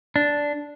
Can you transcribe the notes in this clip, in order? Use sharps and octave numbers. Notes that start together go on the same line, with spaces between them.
D4